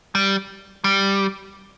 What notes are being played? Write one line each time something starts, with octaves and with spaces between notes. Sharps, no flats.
G3
G3